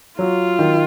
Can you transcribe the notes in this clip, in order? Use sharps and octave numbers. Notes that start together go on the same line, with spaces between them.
F#3 F4
D#3